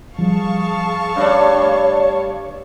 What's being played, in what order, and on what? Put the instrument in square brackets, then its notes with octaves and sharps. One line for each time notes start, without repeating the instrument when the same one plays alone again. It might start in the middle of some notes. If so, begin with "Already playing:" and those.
[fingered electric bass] F3 G3 [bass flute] G#4 [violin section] F5 A5 C#6
[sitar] G2 A3 D5 [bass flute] C#5